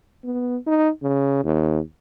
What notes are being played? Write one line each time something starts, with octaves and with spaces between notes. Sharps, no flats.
B3
D#4
C#3
D#2